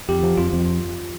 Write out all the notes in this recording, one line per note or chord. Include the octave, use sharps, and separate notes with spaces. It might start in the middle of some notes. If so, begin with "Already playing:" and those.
F2 G4
F3
F2 F4
F2